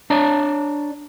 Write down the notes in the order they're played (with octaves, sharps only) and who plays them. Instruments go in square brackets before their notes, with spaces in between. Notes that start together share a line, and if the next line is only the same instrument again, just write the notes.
[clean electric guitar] D4 C#5 D5 A#5